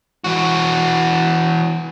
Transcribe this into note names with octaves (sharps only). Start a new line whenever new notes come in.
E3 F#4